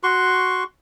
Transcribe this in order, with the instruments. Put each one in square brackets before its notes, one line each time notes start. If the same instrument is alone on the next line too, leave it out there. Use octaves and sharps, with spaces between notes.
[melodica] F#4 C6 C#6